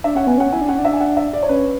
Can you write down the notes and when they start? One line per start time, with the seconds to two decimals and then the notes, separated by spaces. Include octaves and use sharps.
0.04 D4 E5
0.15 C#4 F#5
0.27 B3 G#5
0.38 C#4 F#5
0.53 E4 G#5
0.61 D4
0.69 C#4 F#5
0.78 D4
0.85 E5
0.93 G#5
1.00 F#5
1.17 E5
1.33 D5
1.43 C#5
1.48 C#4 B4